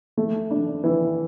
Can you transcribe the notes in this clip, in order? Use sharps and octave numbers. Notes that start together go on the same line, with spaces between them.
A3
D4
E3